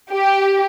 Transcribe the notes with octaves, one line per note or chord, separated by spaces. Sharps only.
G4